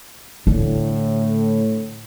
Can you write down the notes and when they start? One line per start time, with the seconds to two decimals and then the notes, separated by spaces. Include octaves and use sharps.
0.47 A2 D3